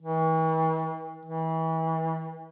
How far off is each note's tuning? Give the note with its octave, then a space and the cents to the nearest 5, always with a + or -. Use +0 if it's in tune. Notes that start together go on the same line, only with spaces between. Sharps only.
E3 -45
E3 -35